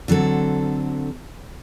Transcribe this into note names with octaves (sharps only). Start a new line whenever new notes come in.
D3 F#3 C4 A4